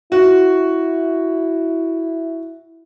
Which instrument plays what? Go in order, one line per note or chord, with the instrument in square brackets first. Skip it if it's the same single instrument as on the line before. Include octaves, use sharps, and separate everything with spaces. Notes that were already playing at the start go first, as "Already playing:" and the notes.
[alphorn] E4 [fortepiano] F#4